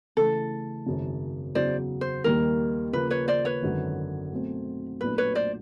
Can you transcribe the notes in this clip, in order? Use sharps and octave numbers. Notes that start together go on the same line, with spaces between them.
C#3 E3 A3 A4
G#1 F#2 C#3
E2 C#3 F#3 C5 D5
C5
D#2 D#3 G3 A#3 A#4
C#3 F3 A#3 B4
B4 C#5
C5 D5
B4 C#5
G#1 F#2 D3 F#3
B2 F#3 A3 C4
B1 A#2 F#3 A3 D4 B4
B4 C#5
C5 D5